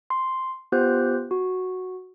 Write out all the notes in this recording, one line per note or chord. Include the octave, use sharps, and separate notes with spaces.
C6
B3 F4 G4 C5 F#6 G6
F#4